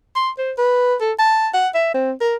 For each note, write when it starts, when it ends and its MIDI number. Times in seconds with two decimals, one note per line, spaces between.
0.16 0.30 84
0.39 0.53 72
0.58 0.95 71
1.01 1.12 69
1.19 1.49 81
1.54 1.68 78
1.74 1.94 76
1.94 2.12 60
2.21 2.36 70